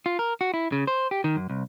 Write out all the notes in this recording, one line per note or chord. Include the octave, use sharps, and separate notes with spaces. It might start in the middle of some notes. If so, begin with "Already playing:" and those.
F4
A#4
F#4
E4
C#3
C5
G4
D#3
F#2
C2